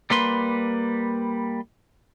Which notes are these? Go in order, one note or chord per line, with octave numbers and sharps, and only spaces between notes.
G3 A#3 B4 C6